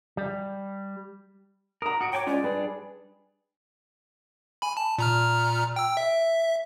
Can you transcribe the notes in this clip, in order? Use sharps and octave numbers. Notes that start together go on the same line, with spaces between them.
G3
F#4 A#4 A#5 D#6
F#4 D#6 C#7 D7
C#5 G5 G#5 D6
G#3 C#4 F4 D5
G3 D4 G#4 B4
G#5 B5
A5
A#2 A#5 F6
G5 E6
E5